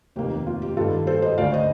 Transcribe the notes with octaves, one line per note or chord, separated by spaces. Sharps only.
F1 D#2 D#3 A#3 G4
F4
G4
G2 D#3 G3 A#3 F4 A4
A4 C5
C5 D#5
D2 D3 A3 D5 F5
C5 D#5